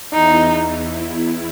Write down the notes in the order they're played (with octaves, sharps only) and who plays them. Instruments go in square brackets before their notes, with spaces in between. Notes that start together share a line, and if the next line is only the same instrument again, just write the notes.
[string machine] E2 E3 [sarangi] D#4